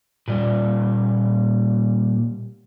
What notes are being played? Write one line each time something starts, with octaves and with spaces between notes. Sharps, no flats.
A#2 G3